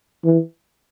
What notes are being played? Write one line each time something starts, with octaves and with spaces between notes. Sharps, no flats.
E3